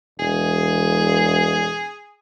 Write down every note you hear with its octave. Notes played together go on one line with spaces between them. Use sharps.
E1 G#4